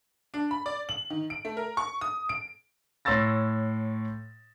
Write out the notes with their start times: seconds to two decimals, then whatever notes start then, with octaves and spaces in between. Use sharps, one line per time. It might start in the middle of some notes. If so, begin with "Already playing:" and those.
0.34 D4
0.51 B5
0.66 D5
0.89 F#7
1.10 D#3
1.30 D7
1.45 A3
1.57 A#4
1.77 C#6
2.01 D#6
2.29 D7
3.05 A2 C#5 C6 E6 A6 A#6